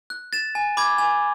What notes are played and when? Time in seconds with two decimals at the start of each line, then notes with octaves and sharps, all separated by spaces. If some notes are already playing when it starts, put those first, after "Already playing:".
0.10 F#6
0.33 A6 E7
0.55 G#5
0.77 B5 D6 G#6
0.98 G#5